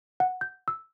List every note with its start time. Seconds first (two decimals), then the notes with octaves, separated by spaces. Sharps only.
0.20 F#5
0.41 G6
0.68 E6